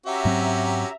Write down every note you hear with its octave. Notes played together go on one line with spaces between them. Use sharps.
C#4 F#4 G4 E5 A#5
G#2 F#3 C4